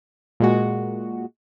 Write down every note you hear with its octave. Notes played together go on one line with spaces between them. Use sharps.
A#2 G#3 F#4